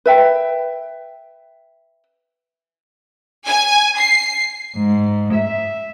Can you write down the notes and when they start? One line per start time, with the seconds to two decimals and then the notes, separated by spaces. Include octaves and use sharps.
0.06 B4 E5 G5
3.47 G#5
3.99 C7
4.77 G#2
5.35 E5